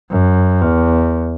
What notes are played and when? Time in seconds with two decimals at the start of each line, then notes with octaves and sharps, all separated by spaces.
0.11 F#2
0.62 E2